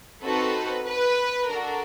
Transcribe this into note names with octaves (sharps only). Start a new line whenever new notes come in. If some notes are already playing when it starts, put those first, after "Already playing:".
C4 D#4 F#4 A4 B4
B4
D4 F#4 A4 A#4